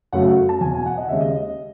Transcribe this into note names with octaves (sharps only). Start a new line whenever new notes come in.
F#2 C#3 F#3 A3 F#5
A5
E2 B2 F#3 G#5
G#5
F#5
D#5
D#2 C#3 G#3 E5
D#5